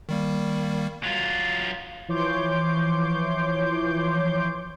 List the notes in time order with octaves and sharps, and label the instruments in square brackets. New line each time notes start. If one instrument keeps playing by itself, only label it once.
[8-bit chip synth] D#3 G3 A#3
[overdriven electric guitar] F#3 F4
[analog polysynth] E3 F3 C#5 C6 D6 G6